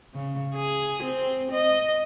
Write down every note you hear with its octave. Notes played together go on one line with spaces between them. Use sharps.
C#3
G#4
C4
D#5